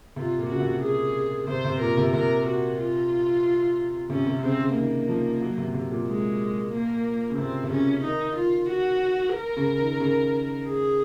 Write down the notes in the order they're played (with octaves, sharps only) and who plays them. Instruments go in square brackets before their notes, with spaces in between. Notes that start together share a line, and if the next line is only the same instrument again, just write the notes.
[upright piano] C3 [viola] F4
[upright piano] A#2
[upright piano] C#3 [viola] F#4
[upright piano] C3
[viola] G#4
[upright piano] C3 [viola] C5
[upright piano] C3
[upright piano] A#2 [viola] A#4
[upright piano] C3
[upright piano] C3 [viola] A#4
[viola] F#4
F4
[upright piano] C3 [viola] C#4
[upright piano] C3
[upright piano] C#3 [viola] C4
[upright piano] C#3
[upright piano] D#3 [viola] A#3
[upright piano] F3
F#3
C3
C3
A#2
[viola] G#3
A#3
[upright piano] C#3
[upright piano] C3 [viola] C4
[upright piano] C3
[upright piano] C#3 [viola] C#4
[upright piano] D#3 [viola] D#4
[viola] F4
F#4
A#4
[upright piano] C#3
D#3
C#3
[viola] G#4